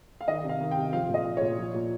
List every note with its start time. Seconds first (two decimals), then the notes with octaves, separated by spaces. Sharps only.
0.21 F5
0.28 D#3 D#5
0.43 C3
0.49 F5
0.61 D#3
0.71 G5
0.77 C3
0.93 F3 F5
1.09 A#2
1.14 D#5
1.26 F3
1.37 A#2 C#5
1.58 F3
1.74 A#2